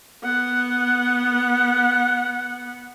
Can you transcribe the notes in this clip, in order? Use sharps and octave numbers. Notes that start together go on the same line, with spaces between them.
B3 F#5